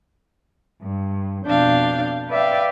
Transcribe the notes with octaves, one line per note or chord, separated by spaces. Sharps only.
G2
F2 B2 D4 F5 G6
B4 D5 E5 F5 G5